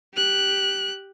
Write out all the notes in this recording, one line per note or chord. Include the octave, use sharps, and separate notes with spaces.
G4 F#6